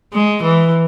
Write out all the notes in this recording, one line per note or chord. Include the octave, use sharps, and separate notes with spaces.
G#3
E3